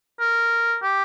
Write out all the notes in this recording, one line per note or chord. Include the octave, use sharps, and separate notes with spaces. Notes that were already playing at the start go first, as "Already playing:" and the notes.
A#4
G4